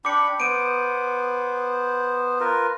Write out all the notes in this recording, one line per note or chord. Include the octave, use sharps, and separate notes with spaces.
D4 G5 B5 D6 C#7
B3 C5 D7 D#7
F4 A#4 B4